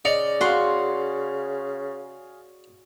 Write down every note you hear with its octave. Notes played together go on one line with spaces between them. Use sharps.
C#3 D5 D#5 C#7 F7
F#4 G#4 F5 C6